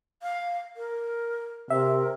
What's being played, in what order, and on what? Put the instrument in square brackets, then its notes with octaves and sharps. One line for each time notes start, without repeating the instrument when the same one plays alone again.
[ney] F5
A#4
[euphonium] C3 [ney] A#4 [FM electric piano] E5